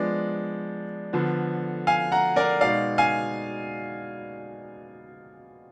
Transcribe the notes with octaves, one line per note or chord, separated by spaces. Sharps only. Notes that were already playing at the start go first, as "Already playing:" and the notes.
Already playing: F3 G#3 B3 D4 D5
D3 F3 B3
F5 G#5
F#5 A#5
A#4 D5
B2 G#3 D#4 D5 F5
F5 G#5